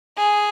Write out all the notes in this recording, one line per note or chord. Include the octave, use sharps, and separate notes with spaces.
G#4